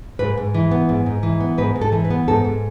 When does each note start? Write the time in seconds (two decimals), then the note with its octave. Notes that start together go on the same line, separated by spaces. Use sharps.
0.19 G#2 B4
0.37 G#2
0.54 E3
0.71 B3
0.89 G#2
1.06 G#2
1.23 E3
1.40 B3
1.58 G#2 B4
1.76 G#2
1.81 A4
1.92 E3
2.05 B4
2.10 B3
2.28 G#2 A4
2.45 G#2